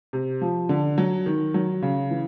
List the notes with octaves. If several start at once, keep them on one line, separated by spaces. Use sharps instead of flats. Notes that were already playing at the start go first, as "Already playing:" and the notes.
C3
F3
D3
F#3
D#3
F#3
C#3
E3